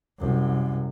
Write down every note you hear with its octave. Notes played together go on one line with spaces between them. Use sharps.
C2 F#2